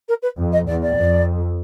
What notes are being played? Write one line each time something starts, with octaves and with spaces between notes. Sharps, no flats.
A#4
B4
F2
D#5
E2 D5
D5
F2